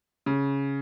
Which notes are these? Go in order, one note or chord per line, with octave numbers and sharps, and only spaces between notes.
C#3